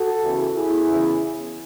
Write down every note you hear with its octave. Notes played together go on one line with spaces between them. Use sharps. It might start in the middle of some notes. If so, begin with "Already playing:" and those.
Already playing: F#4 A4
E2 C#3 E3
E4 G#4
E2 C#3 E3